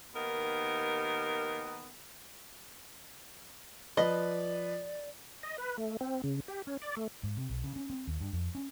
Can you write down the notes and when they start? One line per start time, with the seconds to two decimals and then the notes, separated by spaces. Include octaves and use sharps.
0.14 D#2 D#3 B3 A#4
3.97 F3 B4 D5 D#5
5.43 D#5
5.58 B4
5.78 A3
6.01 C4
6.24 C#3
6.48 G4
6.67 C#4
6.82 D5
6.97 A3
7.23 G#2
7.37 C3
7.49 B1
7.64 C#3
7.76 C#4
7.90 C4
8.07 D#2
8.20 G2
8.33 F2
8.55 C#4